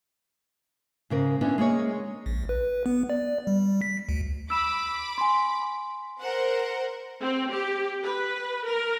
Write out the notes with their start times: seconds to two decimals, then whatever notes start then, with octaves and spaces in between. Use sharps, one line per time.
1.10 G#2 C#3 A#4
1.41 D3 B3 C#4 D4 E4
1.58 G#3 A#3 G#4 C#5
2.26 A#1
2.49 B4
2.86 B3
3.10 D5
3.47 G3
3.81 B6
4.09 D2
4.50 B5 D6 E6 E7
5.18 G#5 C6
6.20 A#4 C5 F#5
7.20 C4
7.50 G4
8.03 B4
8.65 A#4